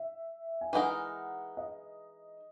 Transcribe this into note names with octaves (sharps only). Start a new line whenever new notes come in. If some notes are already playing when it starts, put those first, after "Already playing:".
Already playing: E5
G#5
E3 G#3 D#4 A#4 F#5
D#5